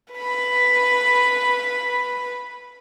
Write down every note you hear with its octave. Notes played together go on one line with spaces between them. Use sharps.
B4 B5